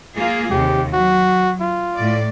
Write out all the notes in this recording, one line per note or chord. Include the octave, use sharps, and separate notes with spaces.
A#3 F4 G#4
D#2 C3 G4
F#3 F#4
F4
A2 D5